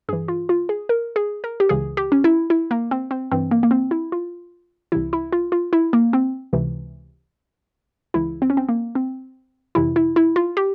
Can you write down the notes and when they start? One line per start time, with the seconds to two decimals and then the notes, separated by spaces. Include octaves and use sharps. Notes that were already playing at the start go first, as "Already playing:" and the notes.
0.08 G2 E3 G#4
0.28 F4
0.49 F4
0.69 G#4
0.89 A#4
1.16 G#4
1.44 A#4
1.60 G4
1.69 C#2 C#3 E3 G#4
1.97 G4
2.12 C#4
2.24 E4
2.50 E4
2.71 A#3
2.91 C4
3.11 C4
3.31 G2 E3 C4
3.51 A#3
3.63 A#3
3.71 C4
3.91 E4
4.12 F4
4.92 C2 C3 E3 E4
5.13 E4
5.32 F4
5.52 F4
5.73 E4
5.93 A#3
6.13 C4
6.53 C#2 C3 E3
8.14 C#2 C#3 E3 E4
8.42 C4
8.50 C#4
8.57 C4
8.69 A#3
8.95 C4
9.75 F2 C3 E3 E4
9.96 E4
10.16 E4
10.36 F4
10.57 G4